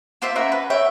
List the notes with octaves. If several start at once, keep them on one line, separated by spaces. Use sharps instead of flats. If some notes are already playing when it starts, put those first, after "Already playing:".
A#3 F4 C5 E5
C#4 A#4 E5 F#5
B4
A#4 C#5 E5 G5